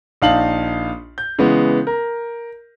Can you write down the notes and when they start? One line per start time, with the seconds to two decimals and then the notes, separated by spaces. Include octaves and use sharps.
0.22 A#1 D#4 F5 A5 F#7
1.18 G6
1.39 C#3 E3 G#3 B3
1.87 A#4